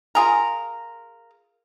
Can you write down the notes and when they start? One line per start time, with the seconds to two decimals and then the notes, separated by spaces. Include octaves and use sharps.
0.15 F4 G#4 A#4